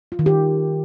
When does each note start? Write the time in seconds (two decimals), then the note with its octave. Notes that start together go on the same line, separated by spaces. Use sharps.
0.12 F4
0.19 D#3
0.26 G4